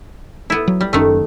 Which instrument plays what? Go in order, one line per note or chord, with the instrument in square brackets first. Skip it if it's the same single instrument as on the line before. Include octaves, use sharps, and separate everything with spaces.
[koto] B3 E4
[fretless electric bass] F#3
[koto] G3
[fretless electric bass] F#1 F#2 C#4 [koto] D#3 A3